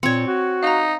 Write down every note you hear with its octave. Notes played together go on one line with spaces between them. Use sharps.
A#2 C4 C#5 C#7
F#4
D#4 F5 A#5